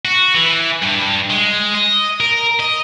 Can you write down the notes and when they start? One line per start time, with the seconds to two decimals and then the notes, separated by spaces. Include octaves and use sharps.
0.05 F#4
0.35 E3
0.82 G2
1.30 G#3
1.74 D#5
2.21 A#4
2.60 D#5